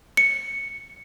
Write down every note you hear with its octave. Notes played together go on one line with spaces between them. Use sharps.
C#7